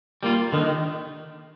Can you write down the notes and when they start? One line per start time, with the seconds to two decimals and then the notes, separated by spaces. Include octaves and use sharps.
0.23 G3 A#3 F4
0.52 D3 D#3